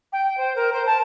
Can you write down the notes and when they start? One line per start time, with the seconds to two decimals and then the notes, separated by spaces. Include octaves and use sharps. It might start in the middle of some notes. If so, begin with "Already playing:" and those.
0.13 G5
0.37 C5
0.56 A#4
0.73 C5
0.86 A5